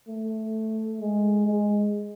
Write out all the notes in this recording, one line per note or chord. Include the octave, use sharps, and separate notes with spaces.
A3
G#3
G#3